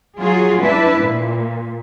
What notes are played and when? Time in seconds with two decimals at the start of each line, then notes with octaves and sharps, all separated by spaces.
0.19 F#3 F4 G#4
0.60 D4 E4 B4 E5
1.00 A#2